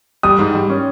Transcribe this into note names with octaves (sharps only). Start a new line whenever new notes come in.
G3 D#6
G#2
G3
C#4